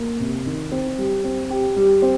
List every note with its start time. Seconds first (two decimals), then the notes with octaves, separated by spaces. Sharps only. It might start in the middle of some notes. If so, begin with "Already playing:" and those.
Already playing: A#3
0.20 C3
0.46 D#3
0.72 C4
0.98 G3
1.24 C4
1.50 G4
1.76 G3
2.02 C4